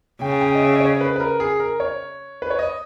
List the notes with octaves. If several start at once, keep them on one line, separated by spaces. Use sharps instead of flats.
C#3 G5
G5
D#5
E5
D#5
C#5
B4
B4
A#4
G#4
A#4
C#5
B4
C#5
D#5